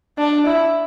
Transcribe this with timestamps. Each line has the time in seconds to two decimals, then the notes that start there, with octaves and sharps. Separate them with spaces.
0.18 D4
0.46 E4